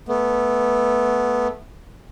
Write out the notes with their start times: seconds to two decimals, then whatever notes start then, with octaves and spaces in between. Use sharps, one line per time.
0.08 A3 B3